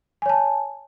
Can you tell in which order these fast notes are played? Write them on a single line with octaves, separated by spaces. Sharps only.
G#5 C#5 A5